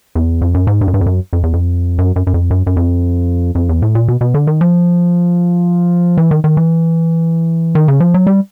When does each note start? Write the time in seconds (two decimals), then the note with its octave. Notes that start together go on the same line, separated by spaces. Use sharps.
0.15 E2
0.41 F2
0.54 F#2
0.67 G#2
0.81 G2
0.88 F#2
0.94 G2
1.01 F2
1.06 F#2
1.33 F2
1.43 E2
1.53 F2
1.98 F#2
2.16 F#2
2.27 F#2
2.34 F2
2.50 F#2
2.67 F#2
2.77 F2
3.55 F2
3.69 E2
3.82 A2
3.95 A#2
4.08 B2
4.21 B2
4.34 D3
4.47 D#3
4.61 F3
6.17 E3
6.31 D#3
6.44 D#3
6.57 E3
7.75 D#3
7.88 C#3
8.00 F3
8.14 F#3
8.27 G3